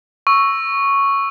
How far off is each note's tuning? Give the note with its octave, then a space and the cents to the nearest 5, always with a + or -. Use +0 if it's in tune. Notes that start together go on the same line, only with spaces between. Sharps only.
C#6 +0 E6 +0